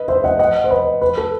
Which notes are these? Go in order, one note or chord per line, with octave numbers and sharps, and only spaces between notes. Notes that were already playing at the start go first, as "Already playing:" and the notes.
Already playing: B4 D#5
C5 E5
D#5 F#5
D#5 F#5
C5
B4 D#5
B4
A4